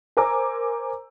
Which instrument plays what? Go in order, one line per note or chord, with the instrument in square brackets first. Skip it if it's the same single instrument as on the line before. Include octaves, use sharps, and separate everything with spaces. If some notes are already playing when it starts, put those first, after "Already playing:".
[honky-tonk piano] A#4 C5 G#5 A#5 D6 E6